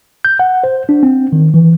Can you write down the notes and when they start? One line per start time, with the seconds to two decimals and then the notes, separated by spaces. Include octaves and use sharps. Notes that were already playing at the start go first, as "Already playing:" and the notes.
0.25 G6
0.39 F#5
0.64 C5
0.89 D4
1.03 C4
1.33 D#3
1.54 E3